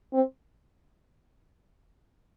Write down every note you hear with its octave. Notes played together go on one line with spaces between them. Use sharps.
C4